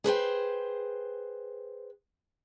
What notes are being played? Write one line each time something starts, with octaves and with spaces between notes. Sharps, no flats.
G#4 B4 C5 G5